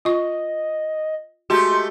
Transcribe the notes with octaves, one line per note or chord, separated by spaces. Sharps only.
F4 D#5 C#6
G#3 A3 F#4 G4 C6